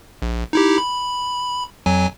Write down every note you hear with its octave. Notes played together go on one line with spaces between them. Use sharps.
A#1
D#4 E4 G4
B5
F2 F#3 G#5